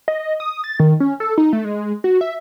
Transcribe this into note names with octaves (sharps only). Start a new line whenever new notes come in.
D#5
D#6
A6
D#3
C#4
A4
D#4
A3
G#3
F#4
E5